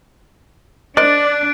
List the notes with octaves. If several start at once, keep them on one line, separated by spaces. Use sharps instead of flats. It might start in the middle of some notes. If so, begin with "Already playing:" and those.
D4 A#4 C5 D5 D#5 F#6 D7